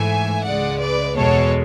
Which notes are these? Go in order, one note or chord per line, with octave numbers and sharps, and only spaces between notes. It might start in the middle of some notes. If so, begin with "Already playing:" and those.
Already playing: G#2 E3 A3 E5 G#5
C#2 C#3 G#3 D5 F#5
B4 D5
E2 B2 G#3 A4 C#5